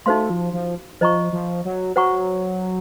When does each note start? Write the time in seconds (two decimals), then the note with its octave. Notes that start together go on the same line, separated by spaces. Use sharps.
0.06 A3 D#4 F#4 C5 F5 C6
0.30 F3
0.53 F3
1.01 F3 C5 D#5 A#5 C#6
1.33 F3
1.65 F#3
1.96 F#3 C5 F#5 A#5 C#6